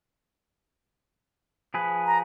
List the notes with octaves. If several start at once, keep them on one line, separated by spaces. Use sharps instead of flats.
F3 G#4 B4
A#5